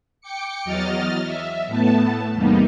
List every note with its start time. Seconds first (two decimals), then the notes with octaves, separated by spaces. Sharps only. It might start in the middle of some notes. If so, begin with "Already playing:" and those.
0.21 G5 D6 C#7
0.65 E2 F#3 D#5 F6 A6
1.24 E5
1.67 A2 A3 B3 A5
2.33 E2 C3 G3 A#3 B3 D#4